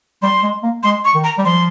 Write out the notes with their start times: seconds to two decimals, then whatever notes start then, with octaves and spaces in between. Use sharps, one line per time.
0.23 G3 C6
0.43 G#3
0.63 A#3
0.83 G#3 C6
1.05 C#6
1.14 D#3
1.24 A#5
1.38 G3
1.45 F3 C6